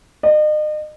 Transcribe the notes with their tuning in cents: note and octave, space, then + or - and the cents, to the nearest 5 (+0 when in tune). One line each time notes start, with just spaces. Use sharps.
D#5 -40